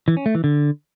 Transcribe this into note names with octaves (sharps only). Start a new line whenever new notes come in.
E3
C#4
A3
E3
D3